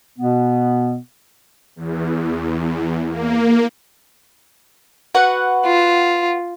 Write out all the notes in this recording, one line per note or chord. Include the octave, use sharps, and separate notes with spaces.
B2 B3
E2
A#3
F#4 B4 F#5
F4